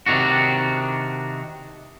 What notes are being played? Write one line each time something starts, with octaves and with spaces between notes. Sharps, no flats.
C3 D#3 D4 F#4